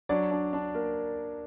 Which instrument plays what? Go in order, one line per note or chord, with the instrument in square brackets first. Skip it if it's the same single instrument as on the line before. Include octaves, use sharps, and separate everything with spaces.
[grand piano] F#3 D4 D5
D4
D4
A#3